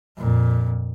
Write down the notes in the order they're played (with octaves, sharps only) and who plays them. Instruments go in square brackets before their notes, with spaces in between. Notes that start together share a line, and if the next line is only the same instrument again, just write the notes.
[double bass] F2 A#2